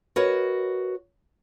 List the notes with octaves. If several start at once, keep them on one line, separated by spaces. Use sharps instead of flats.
F#4 A#4 B4 C#5 D#5